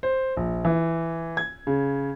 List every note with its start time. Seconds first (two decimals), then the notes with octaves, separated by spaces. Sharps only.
0.03 C5
0.37 A#1
0.65 E3
1.37 G#6
1.67 C#3